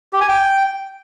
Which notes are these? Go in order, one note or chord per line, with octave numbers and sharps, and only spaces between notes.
G4
G#5
G5